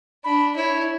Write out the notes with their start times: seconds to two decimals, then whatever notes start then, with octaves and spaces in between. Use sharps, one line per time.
0.24 D4 B5
0.56 E4 C#5